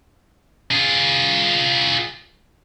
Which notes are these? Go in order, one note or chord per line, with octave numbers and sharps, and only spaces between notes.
F4 G#4